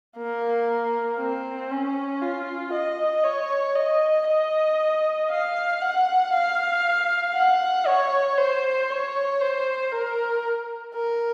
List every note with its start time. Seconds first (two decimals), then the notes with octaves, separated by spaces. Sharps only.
0.17 A#3
1.19 C4
1.71 C#4
2.22 F4
2.73 D#5
3.25 C#5
3.76 D#5
4.28 D#5
5.30 F5
5.82 F#5
6.33 F5
7.35 F#5
7.87 C#5
8.38 C5
8.90 C#5
9.41 C5
9.92 A#4
10.95 A#4